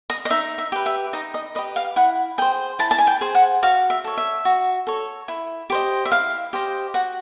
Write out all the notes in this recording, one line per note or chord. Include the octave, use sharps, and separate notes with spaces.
D#5
D#5
D#4 E5
E5
G4 B4
E5
D#4 D#5
D#5
G4 B4 D#5
F5
E4 F#5
G#4 C5 G5
E4 A5
A5
G#5
G5
G#4 C5
F#5
F#4 F5
E5
A4 C#5
E5
F#4
A4 C#5
E4
G4 C5 D#5
E5
E4 F5
G4 C5 D#5
F#4 F#5